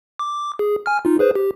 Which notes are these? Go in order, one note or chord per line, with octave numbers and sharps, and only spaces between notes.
D6
G#4
G#5 F6
D#4 F4
G#4 B4 C5
G4